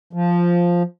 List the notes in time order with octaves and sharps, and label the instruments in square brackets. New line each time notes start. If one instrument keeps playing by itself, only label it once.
[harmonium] F3